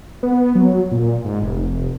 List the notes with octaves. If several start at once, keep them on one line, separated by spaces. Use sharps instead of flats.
B3
F#3
A#2
G#2
F1